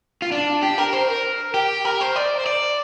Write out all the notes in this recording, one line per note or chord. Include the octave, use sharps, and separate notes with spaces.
F4
D4
G4
A#4
C5
A#4
G4
A#4
C5
D5
C5
D5